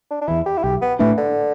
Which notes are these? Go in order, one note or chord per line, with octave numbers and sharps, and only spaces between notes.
D4
D4
E2 E3 E4
G4
E4
B1 G4
B3
A2 E3 A3 D4
D3